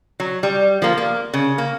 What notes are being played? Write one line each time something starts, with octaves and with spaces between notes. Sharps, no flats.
F#3
G3
F3 A#3
A#3
C#3
A#3